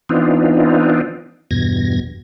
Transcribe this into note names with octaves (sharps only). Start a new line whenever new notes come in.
E3 B3 C4 D4 D#4 F4
E2 G2 B2 G#6 A#6